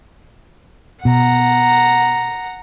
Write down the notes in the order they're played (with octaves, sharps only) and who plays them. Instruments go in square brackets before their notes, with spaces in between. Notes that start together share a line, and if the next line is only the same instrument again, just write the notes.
[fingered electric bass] B2 [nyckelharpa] F#5 A#5